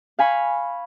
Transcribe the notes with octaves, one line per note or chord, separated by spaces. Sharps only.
F5 G#5 B5 C#6